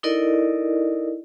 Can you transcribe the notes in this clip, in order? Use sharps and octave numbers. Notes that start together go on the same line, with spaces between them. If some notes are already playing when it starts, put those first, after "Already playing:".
D#4 E4 A4 A#4 D5 D#5